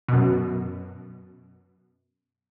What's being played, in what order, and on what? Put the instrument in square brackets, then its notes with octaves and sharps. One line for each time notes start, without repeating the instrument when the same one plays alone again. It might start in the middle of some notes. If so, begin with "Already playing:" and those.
[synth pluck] F#2 B2